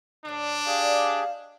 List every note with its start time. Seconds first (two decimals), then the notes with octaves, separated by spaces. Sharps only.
0.25 A2 D3 D4
0.67 G4 G#4 D5 D#5 F5 G5